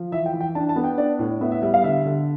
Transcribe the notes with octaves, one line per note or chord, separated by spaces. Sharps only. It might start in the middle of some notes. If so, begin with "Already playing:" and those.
Already playing: F3
E3 E5
G5
E3
G5
D4 A5
A5
B3
G5
D4 D5
A2
B3 E5
E5
G3 E5
F5
D3 E5
D3